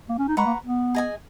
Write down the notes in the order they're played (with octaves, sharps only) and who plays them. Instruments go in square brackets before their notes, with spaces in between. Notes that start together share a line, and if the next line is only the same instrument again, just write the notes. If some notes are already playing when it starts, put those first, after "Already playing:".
[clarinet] A#3
C#4
D#4
[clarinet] G#3 [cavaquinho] B4 F#5 A#5 C#6
[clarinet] A#3
B3
[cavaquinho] G#4 D#5 G#5